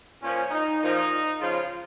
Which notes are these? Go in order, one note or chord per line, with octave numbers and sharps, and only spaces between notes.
A#2 F3 C#4
D#4
A#2 F3 D#4
C#3 F3 F4